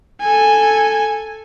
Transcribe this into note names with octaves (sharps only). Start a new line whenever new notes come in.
A4 G#5